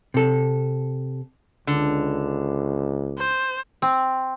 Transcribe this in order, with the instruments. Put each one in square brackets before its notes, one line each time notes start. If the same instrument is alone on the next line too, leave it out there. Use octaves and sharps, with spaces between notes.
[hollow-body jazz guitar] C3 A4
[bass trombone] C#2 [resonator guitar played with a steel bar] D3
[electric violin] C5
[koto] C4